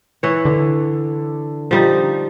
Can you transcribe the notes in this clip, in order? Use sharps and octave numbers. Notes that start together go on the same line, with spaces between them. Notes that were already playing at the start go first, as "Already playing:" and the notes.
E3 C#5
D3
F3 G3 D#4